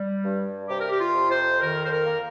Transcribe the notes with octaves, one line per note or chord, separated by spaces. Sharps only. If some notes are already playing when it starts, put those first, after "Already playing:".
Already playing: G3
G2
C3 G4
A#4
G4
F4
F2
C5
D#3 A#4
C5
A#4
A#3